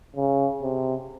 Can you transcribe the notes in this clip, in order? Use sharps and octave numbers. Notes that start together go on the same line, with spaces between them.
C#3
C3